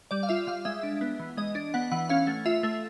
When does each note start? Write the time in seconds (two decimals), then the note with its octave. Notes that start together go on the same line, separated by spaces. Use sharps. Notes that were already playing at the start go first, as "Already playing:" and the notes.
0.11 G3 D5
0.23 F5
0.29 F4 E5
0.47 G3 F5
0.65 G#3 E5
0.83 D4
1.01 B3
1.20 E3
1.37 G#3 D#5
1.55 D4
1.74 B3 F#5
1.91 E3 F#5
2.09 C#4 F5
2.27 A3
2.46 F4 E5
2.63 A3